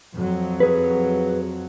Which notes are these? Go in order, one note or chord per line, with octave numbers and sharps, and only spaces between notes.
F2 F#3
G#4 B4